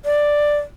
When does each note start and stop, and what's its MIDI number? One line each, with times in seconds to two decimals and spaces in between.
0.05 0.58 74